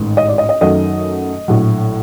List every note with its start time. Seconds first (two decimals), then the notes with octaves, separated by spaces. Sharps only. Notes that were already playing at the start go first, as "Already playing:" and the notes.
Already playing: A1 G#2 D#3
0.17 D#5
0.28 D5
0.38 D#5
0.49 D#5
0.61 F#2 D#3 F#3 A3 D#5
1.48 A#1 A2 F#3